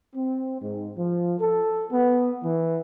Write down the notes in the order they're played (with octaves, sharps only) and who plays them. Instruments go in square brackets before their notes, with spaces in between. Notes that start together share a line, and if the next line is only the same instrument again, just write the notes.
[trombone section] C4
G#2
F3
A4
B3
E3